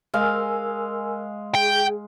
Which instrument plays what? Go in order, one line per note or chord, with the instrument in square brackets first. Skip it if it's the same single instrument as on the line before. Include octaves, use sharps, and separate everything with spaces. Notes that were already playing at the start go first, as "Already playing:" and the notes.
[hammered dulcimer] G#3 F5 [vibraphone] A#4 G#5 E6
[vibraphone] G#4 [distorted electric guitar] G5